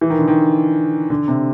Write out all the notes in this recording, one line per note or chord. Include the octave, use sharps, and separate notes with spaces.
E3
D#3
D3
D#3
D3
C3